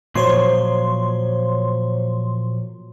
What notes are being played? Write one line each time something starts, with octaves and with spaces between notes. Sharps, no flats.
A#2 F3 F#3 C5 C#5 C6